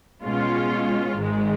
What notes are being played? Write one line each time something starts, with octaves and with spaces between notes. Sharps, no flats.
B2 G#3 C#4 F4
G#1 G#2 D#3 G#3